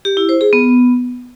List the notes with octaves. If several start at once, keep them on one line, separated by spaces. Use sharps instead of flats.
G4
E4
C5
G#4
B3